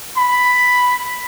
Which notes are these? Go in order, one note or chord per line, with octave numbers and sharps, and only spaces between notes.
B5